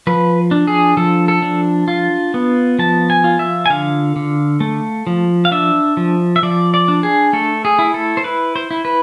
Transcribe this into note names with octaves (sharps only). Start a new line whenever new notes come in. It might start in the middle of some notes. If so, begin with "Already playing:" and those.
F3 B4
D4
G#4
F3 A4
A4
D4
F4
B3
F3 A5
G#5
F4
E5
G#5
D3 F5
D3
A3
F3
F5
D4 E5
F3
E5
F3 D5
D5
D4
G#4
A3 A4
G#4
E4
A4
C5
E4 B4
C5
E4
B4